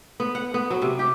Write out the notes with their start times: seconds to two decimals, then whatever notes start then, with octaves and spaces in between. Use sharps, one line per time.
0.20 B3
0.35 F#5
0.54 B3
0.70 F#3
0.82 C3
0.99 G4